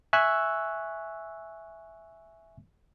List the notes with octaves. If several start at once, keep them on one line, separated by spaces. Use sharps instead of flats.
E5 G#5 C#6 E6 F#6